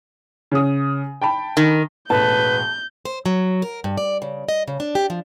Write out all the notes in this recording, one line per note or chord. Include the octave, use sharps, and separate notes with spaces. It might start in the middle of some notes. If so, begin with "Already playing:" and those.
C#3 D#6
G5 A5 B5
D#3
E1 A1 B4 A5 G6
C5
F#3
A#4
G2
D5
C#3
D#5
C#3
D4
G4
F3